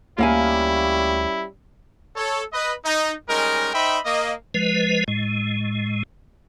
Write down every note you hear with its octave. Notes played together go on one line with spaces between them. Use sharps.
D2 G3 A#3 C#4 E4 F5 G#5
A4 C#5
B4 D#5
D#4
G3 G#3 C#4 D#4 A#4
D#4 C5 D#5 E5 G5 B5
A#3 D#5
F3 G#3 B4
A2 G#3